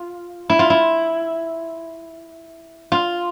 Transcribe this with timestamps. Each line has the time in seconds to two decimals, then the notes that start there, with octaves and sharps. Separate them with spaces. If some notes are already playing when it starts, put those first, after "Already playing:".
Already playing: F4
0.50 E4
0.59 F4
0.70 E4
2.92 F4